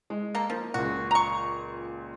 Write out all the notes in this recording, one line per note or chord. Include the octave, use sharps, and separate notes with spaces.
G#3
A#3 A4
F3 A#3
C#2 A#2 F#4
A#5 C#6